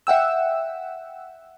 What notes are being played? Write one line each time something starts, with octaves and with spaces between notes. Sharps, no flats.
E5 F#5 G5 E6